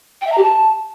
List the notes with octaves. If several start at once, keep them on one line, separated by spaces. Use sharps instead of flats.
G5
E5
A#5
G4
A5